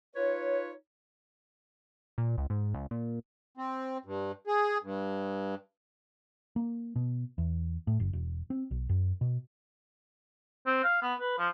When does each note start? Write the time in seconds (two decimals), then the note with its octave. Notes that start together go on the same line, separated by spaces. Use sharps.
0.15 D#4 F4 B4 C#5
2.18 A#2
2.38 C#2
2.50 G#2
2.74 C#2
2.91 A#2
3.57 C4
4.05 G2
4.47 G#4
4.83 G2
6.56 A#3
6.96 B2
7.38 E2
7.87 A2
8.00 F#1
8.13 E1
8.50 C4
8.71 B1
8.89 F#2
9.21 B2
10.66 C4
10.84 F5
11.02 B3
11.20 B4
11.39 F3